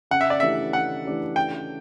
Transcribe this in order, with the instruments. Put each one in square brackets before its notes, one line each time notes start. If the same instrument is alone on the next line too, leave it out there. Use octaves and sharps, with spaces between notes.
[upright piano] C#3 [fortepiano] F#5
[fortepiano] E5
D5
[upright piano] E3 A3 D4 G4 [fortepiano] E5
[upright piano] C#3 [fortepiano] F#5
[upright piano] E3 A3 D4 G4
[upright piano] C#3 [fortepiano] G5